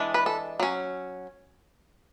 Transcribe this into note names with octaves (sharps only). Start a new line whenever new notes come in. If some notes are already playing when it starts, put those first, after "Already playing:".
Already playing: E3 G#3 D4
B4
A4
F#3 C#4